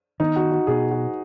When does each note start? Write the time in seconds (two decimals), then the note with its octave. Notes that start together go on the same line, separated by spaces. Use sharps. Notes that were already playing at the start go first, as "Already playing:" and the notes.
0.20 D#3 B3 D#4
0.36 F#4
0.51 F#4
0.67 B2 B3 G#4
0.91 F#4